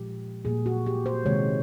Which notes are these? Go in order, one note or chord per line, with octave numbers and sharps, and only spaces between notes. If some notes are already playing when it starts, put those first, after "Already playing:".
Already playing: A#2 F3 G#3 G4
A#2 G3 A#3 G#4
F#4
G4
C5
C3 D#3 G#3 C#5